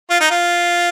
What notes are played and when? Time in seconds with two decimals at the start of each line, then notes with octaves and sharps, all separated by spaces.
0.10 F4
0.20 D#4
0.30 F4